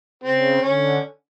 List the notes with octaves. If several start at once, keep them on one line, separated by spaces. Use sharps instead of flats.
C#3 C4
D3 C#4